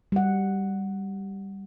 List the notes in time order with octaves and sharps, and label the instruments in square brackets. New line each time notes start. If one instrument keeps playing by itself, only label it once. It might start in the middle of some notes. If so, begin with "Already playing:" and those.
[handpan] G3 F#5